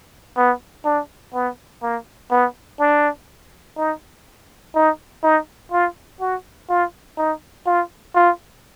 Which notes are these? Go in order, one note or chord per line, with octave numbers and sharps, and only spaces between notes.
B3
D4
B3
A#3
B3
D4
D#4
D#4
D#4
F4
F#4
F4
D#4
F4
F4